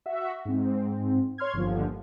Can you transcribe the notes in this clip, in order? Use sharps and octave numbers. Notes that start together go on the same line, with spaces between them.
F#4 E5
G#2 C4
C#5 C6 F6 G#6
G1 D#2 D3 F3